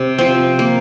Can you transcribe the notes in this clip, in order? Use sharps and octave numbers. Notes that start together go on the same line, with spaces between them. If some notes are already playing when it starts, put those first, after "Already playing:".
Already playing: C3
F3 C4
A#3